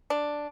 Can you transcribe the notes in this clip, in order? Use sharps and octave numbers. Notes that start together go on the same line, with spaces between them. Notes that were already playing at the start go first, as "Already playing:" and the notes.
D4